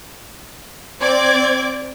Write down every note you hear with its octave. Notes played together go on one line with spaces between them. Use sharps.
C4 D5 D6 G#6